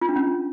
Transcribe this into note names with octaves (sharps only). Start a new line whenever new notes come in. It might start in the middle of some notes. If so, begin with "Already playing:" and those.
F4
D4
C#4